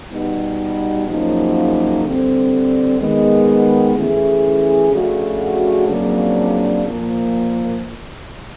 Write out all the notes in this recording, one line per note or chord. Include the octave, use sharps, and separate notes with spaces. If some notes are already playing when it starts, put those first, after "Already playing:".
B2 G3 B3 D#4
F#2 C#3 F3 A#3 D#4
D3 G3 C4
D#3 G#3 B3
E3 A3 C#4 E4 G#4
C#3 F3 A3 D4 F#4
F2 C#3 F#3 A#3 D4
A#2 F3 A#3